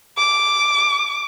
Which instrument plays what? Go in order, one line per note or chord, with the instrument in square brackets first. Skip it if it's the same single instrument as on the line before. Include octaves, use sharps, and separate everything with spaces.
[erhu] D6